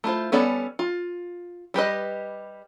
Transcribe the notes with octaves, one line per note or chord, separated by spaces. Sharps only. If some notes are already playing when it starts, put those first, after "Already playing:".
A3 E4 F4 C5
G3 B3 C#4 A4 D5
F4
G3 G4 B4 D#5